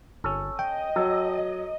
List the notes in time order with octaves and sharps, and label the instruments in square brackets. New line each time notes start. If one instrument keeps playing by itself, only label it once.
[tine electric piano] G1 [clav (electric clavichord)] C#4 A4
[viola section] D#5 [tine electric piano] G5
[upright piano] F#3 [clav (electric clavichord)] A4